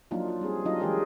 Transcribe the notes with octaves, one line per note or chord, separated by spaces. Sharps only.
F3 F#3 A#3 D4 D#4 F4
F4
G3 C4 G#4
F#3 D4 D#4 F4 D#5
E3 G#3 G4 G#4 A#4 D5